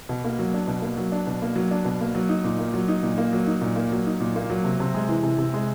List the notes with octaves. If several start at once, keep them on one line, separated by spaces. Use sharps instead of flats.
B2
A#3
F#3
D4
B2
A#3
F#3
D4
B2
A#3
F#3
D4
B2
A#3
F#3
D#4
A#2
A#3
F#3
D#4
A#2
A#3
F#3
D#4
A#2
A#3
F#3
D#4
A#2
A#3
F#3
C3
C3
G#3
E3
C3
C3
G#3